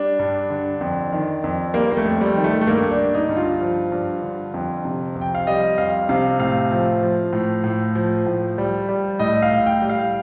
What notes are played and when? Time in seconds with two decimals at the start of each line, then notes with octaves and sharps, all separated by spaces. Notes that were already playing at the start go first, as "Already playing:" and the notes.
Already playing: G3 D4
0.19 G2
0.50 D3
0.81 F2
1.12 D#3
1.44 F2
1.74 G3 A#3
1.91 A#3
1.97 A3
2.05 F2
2.21 G3
2.36 D#3
2.44 A3
2.61 A3
2.67 G2 A#3
2.91 D4
2.98 D3
3.14 D#4
3.29 G2
3.37 F4
3.61 F3
3.92 G2
4.22 D3
4.54 F2
4.85 C3
5.15 F2
5.21 G5
5.35 F5
5.47 G3 D#5
5.78 F2 F5
6.09 C3 F5
6.39 A2 F5
6.71 F3
7.02 F3
7.33 A2
7.64 A2
7.95 F3
8.26 A2
8.58 G3
8.89 G3
9.19 A2 D#5
9.42 F5
9.51 A2
9.66 G5
9.82 G3
9.89 F5